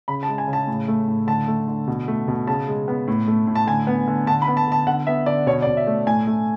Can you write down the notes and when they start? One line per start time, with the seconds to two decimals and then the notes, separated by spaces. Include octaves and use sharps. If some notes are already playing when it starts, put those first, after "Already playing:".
0.08 C#3 B5
0.23 A5
0.28 G#3
0.38 G#5
0.48 C#3
0.53 A5
0.67 A2
0.88 A3
1.07 A2
1.27 D3 A5
1.48 A3
1.68 D3
1.87 B2
2.08 A3
2.28 B2
2.47 C#3 A5
2.68 G#3
2.88 B3
3.07 A2
3.27 A3
3.47 A2
3.55 A5
3.67 D3 G#5
3.87 B3
4.07 D3
4.27 D3 A5
4.42 B5
4.48 B3
4.57 A5
4.67 D3 A5
4.87 D3 F#5
5.07 B3 E5
5.26 D3 D5
5.47 B2 C#5
5.62 D5
5.67 B2
5.77 E5
5.87 A3
6.07 A2 G#5
6.27 A3